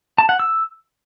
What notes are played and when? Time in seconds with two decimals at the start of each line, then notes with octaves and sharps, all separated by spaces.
0.18 A5
0.29 F#5
0.40 E6